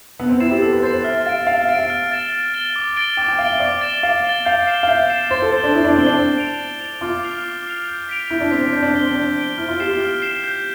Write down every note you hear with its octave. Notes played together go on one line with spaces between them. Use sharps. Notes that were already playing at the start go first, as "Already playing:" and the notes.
B3 E6
C4
E4 A6 C7 E7
G4
A4 E6
B4
C5 A6 C7 E7
C5
E5 F6
F5 A6 D7
F5 F6
F5
E5 A6 D7
F5
F6
A6 E7 G7
F6
A6 E7 G7
D6
A6 D7 G7
G5 D6
G5
F5 A6 D7 G7
E5
D5 D6
A6 E7 G7
F5 D6
A6 E7 G7
F5 G6
C7 E7 G7
F5
E5 G6
C7 E7 G7
C5 A6
A4
C5 E7 G7
D4
E4 A6
D4
C4 E7 G7
D4
A6
D7 F7
A6
D7 F7
F4 D6
F6 C7 F7
D6
F6 C7 F7
G6
B6 D7 F7
E4 G6
D4
C4 B6 D7 F7
C4
D4 G6
D4
C4 D7 G7
C4
D4 G6
D7 G7
E4 F6
F4
G4 C7 E7
F4
F6
C7 E7
G6